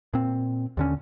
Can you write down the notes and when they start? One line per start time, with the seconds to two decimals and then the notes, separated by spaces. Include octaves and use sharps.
0.14 A#2 C4
0.77 D#2 D3 C#4